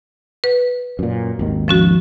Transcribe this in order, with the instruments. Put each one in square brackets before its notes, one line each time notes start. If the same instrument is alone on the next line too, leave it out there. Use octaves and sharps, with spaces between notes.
[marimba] B4
[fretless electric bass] F#2 A#2
G#1 D#2 D#3
[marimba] F3 C#4 F#4